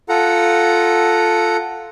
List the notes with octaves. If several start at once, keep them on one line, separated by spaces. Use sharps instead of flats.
F4 A4 F#5 A#5